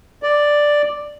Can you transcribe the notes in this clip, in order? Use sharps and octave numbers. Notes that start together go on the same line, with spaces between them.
D5